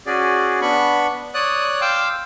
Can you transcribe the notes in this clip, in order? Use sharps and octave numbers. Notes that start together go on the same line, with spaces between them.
C#4 F#4 G#4 D5
B3 D4 B5 C#6
C#5 D5 D#6 F#6
F5 G5 C6 D6 E6